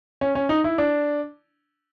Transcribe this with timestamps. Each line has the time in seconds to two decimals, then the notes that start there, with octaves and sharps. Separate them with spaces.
0.21 C#4
0.35 C#4
0.49 D#4
0.64 E4
0.78 D4